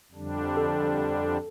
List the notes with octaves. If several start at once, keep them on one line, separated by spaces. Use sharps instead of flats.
F2 D3 G3 D4
A4